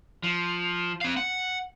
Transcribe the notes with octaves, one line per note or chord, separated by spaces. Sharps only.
F3
C4 F5
F#5